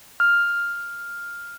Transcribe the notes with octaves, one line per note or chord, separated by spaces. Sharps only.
F6